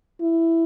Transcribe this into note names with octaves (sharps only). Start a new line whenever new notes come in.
E4